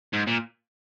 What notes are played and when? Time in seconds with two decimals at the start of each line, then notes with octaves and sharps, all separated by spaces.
0.13 G#2
0.27 A#2